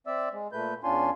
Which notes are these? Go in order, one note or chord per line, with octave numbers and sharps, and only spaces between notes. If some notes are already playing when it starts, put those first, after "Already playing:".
C4 D5 E5 E6
G#3
A#2 A3 B4 G6
E2 C#4 D4 F4 G#5 C6